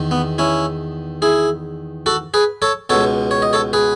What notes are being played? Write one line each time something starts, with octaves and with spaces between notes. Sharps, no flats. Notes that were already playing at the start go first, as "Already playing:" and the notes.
Already playing: E2 D#3
B3
C#4 E4
E4 G#4
F#4 A4
G#4 B4
A4 C#5
C#2 B2 A4 C#5
C#5
D#5
A4 C#5
G#4 B4